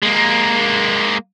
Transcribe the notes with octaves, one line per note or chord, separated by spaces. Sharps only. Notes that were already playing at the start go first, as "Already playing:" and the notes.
G#3 A#3